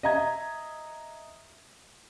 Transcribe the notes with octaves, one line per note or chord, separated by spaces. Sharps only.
D#5 E5 A#5 G#6